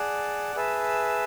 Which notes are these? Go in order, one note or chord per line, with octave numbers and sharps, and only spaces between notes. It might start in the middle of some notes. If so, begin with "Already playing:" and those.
Already playing: G#4 D5 F#5 A5
G#4 B4 E5 A5